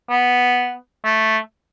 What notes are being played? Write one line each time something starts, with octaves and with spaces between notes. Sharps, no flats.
B3
A3